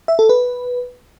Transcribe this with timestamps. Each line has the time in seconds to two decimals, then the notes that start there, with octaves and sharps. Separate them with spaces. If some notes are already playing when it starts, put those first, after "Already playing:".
0.08 E5
0.19 A4
0.29 B4